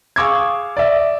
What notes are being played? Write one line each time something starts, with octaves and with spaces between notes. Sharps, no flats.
G#4 F5 C#6 D6 E6 G#6
D5 E5